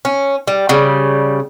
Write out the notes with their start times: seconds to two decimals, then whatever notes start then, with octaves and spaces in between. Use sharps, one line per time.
0.05 C#4
0.47 G3
0.69 C#3 G3